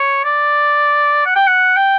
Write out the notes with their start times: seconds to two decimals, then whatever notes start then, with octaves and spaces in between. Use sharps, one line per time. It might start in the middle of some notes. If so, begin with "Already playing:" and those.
Already playing: C#5
0.25 D5
1.26 F#5
1.36 G5
1.47 F#5
1.77 G5